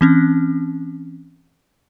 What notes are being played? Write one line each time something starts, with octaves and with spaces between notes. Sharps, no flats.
E3 C4 C#4